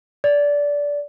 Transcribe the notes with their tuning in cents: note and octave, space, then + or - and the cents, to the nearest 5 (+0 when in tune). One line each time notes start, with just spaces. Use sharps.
D5 -20